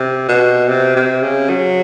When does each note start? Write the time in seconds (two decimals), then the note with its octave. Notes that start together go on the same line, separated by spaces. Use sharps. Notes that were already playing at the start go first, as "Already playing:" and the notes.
Already playing: C3
0.29 B2
0.68 C3
0.96 C3
1.23 C#3
1.49 F#3